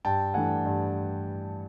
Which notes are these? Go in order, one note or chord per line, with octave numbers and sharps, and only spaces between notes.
G2 G5 A5
E3 A3 D4 F#5 G#5
G2